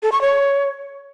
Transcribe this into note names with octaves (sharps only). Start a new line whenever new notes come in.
A4
C#6
C#5